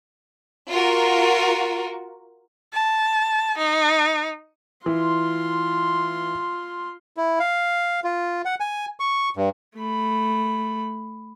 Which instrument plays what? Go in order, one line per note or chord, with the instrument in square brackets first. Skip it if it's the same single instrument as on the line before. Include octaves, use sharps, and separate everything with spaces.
[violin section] F4 F#4 A#4
[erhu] A5
D#4
[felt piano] E3 [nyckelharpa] F4 C6
[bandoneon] E4
F5
F4
F#5
G#5
C#6
G2
[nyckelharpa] A3 B5